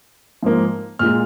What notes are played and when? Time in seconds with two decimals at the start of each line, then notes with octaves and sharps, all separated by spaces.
0.43 G#2 F3 A#3
0.99 A#2 G#3 F6